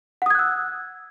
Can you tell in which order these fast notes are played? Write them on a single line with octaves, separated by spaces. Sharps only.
F#5 D#6 G#6 F#6 E6